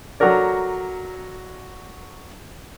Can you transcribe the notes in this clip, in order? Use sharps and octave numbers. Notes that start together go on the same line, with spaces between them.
F#3 F#4 A4 A#4 D5